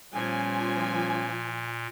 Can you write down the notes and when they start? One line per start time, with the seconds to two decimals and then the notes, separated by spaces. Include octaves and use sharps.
0.14 A#2 F3 G3 B3 C#4 G#5